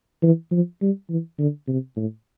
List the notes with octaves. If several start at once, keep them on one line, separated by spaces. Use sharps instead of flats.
E3
F3
G3
E3
D3
C3
A2